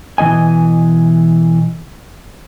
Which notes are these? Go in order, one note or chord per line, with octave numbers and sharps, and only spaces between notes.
B2 E3 D4 D#5 G#5